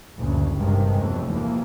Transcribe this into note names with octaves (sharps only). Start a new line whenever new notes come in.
F#1 D2 C#3
G#1 G2 C3 D#3 G#3
F1 E2 F#3 A3
D#2 E3 F3 A#3